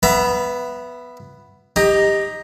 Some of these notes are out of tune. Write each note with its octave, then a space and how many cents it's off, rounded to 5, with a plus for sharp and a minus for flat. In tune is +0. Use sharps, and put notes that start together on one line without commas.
B3 +0 E5 +20 A#5 +45
D#4 +0 G4 +20